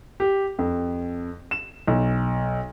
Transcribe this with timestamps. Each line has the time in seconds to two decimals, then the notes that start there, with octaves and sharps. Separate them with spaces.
0.20 G4
0.59 F2
1.51 E7
1.87 B1